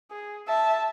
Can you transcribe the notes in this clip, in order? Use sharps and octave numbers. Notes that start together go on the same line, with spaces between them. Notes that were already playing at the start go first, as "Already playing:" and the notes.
G#4
E5 A5